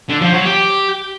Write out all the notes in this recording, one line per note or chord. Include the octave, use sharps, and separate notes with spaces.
D3
F3
F#3
G4